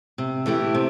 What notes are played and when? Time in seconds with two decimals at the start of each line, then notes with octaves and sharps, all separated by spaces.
0.18 C3
0.46 E3 A3 E4 G4
0.75 C3